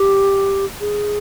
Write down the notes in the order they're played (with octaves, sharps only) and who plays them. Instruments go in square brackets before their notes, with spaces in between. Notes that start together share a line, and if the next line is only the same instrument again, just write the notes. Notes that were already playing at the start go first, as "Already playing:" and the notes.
Already playing: [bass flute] G4
G#4